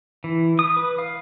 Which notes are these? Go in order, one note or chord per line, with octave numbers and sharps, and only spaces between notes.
E3
D#6
B4
F5